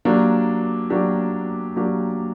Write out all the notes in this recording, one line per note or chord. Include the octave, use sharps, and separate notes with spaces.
F#3 A#3 D4 G4
F#3 A#3 D4 G4
F#3 A#3 D4 G4